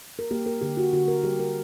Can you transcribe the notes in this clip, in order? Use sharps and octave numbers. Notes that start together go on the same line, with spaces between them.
A#4
A#3 G4
A#4
D3 G4
F#4
D3 F#4
A#4
G3 G4
A#4